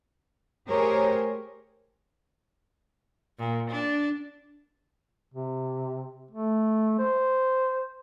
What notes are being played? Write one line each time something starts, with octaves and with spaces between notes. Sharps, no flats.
A3 G4 G#4 A#4 C5 C#5
A#2
D4
C3
A3
C5